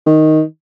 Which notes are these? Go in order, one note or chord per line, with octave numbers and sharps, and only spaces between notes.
D#3